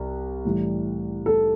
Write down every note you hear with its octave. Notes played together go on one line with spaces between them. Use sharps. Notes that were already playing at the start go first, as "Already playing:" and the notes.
Already playing: C2
A2 E3 G3
A4